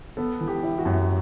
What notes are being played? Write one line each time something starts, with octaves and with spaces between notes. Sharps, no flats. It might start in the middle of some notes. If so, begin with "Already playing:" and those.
B3 A4
E3
G4
E4
F#4
F#2